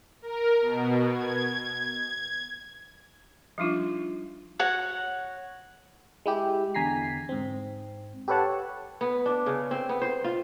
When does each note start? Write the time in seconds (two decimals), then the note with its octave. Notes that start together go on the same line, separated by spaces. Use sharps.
0.22 A#4
0.61 B2
1.12 G#6
3.58 F3 G3 D4 D#4 F4
4.59 F#4 C#5 F#5
6.26 G#3 E4 G4
6.74 E2 D3 G#5 A#5 B6 C7
7.29 G#2 C4
8.28 G4 A4 B4 C#5 F#5 A5
9.01 B3
9.26 D4
9.46 C#3
9.71 C4
9.89 B3
10.02 C5
10.24 F4